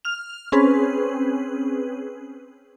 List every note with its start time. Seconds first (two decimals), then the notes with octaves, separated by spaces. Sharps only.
0.05 F6 F7
0.52 C4 C#4 G#4 B4